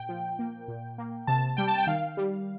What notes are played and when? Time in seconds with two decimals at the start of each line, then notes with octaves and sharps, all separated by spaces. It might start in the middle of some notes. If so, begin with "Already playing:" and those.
Already playing: A#2 G5
0.09 F3
0.39 A#3
0.68 A#2
0.98 A#3
1.27 C3 A5
1.57 G3 G5
1.68 A5
1.78 G5
1.87 D#3 F5
2.17 G3